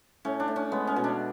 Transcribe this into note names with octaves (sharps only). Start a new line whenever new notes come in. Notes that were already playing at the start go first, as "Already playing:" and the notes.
A2 C#4
D4
A2
C#4
G#3 B3
C#4
B2
D4